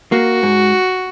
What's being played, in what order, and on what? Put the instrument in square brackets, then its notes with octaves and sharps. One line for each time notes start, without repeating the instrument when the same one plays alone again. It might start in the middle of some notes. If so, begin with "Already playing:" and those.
[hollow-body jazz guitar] A#3 [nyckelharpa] F#4
[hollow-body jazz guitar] G#2